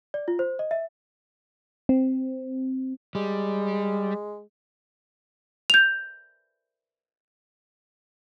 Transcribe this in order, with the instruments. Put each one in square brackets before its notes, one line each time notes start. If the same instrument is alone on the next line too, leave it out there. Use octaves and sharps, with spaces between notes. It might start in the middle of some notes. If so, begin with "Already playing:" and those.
[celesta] D5
F4
C5
D#5
E5
[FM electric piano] C4
[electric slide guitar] G3 [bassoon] G#3
[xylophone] G6 F7